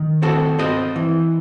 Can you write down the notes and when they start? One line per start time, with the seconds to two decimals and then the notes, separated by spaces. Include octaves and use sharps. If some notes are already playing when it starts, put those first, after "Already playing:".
Already playing: D#3
0.22 C4 F#4 A4
0.59 C4 C5 D#5
0.96 E3